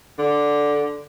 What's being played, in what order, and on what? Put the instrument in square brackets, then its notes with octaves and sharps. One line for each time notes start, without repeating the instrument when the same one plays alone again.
[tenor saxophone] D3